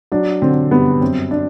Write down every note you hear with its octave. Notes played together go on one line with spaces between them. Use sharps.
F#3 D4
D3 C4
G2 B3
F#2 C4
D4